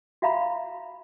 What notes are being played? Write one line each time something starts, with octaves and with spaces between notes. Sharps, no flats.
F#4 E5 F5 A#5 B5